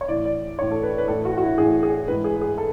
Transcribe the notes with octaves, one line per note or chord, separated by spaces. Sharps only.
C#5
A2 E3 D5
D5
A2 E3 C#5
A4
B4
B4
A2 E3 A4
F#4
F#4
E4
A2 E3 G#4
G#4
G#2 E3 B4
G#4
G#4
A4